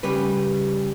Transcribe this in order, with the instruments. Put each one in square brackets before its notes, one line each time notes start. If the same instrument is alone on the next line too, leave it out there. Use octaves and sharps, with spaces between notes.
[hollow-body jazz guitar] C#3 G3 B4